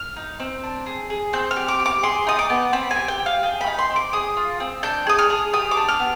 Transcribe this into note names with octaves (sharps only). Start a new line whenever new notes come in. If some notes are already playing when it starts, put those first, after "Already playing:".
Already playing: F6
D#4
C4
D4
G#4
G#4
C4 G6
F6
G4
D6
G4
D6
G#4 C6
D#4 D#6
D6
B3
C4 B5
G#5
G4
G5
G4
F5
G#4 G5
B5
D#4
C6
C4
D6
G#4 D#6
F4
C4
D4 G6
G#4 D#6
F6
G#4
G4 D#6
D6
D4
F6
B3